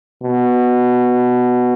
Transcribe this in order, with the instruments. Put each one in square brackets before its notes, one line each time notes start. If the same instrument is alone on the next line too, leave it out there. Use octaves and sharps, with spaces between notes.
[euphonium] B2